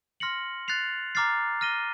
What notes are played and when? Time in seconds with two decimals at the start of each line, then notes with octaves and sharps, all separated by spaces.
0.20 C6 F6 A#6 C#7 F#7
0.68 F#6 A6 C7 F7
1.15 A#5 D6 F6 A6 C7
1.61 F6 A#6 D#7 G7